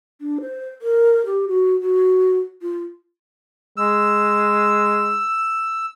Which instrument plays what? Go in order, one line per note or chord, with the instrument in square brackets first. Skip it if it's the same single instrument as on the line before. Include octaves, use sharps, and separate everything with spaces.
[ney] D4
C5
A#4
G4
F#4
F#4
F4
[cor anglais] G#3 [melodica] E6